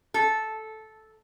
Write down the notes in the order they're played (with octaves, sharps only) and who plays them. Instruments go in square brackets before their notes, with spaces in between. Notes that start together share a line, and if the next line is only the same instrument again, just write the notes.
[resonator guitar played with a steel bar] A4